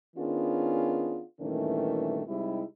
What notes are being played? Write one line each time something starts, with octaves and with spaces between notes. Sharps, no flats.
D#3 B3 C#4 D4 F4 G#4
G2 A#2 D#3 E3 A3 C#4
C3 G3 G#3 D#4 E4